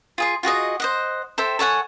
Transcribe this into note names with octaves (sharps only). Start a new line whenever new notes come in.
F4 G#4 C6
F4 F#4 G#4 D#5
C5 D#5 F#5
A4 C5 E5 G5
A4 C#5 F#5 G#5